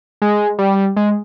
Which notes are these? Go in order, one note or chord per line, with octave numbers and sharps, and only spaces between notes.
G#3
G3
G#3